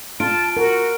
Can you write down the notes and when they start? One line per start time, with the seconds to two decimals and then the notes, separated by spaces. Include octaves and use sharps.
0.20 F4 A5 D7
0.57 F#4 A#4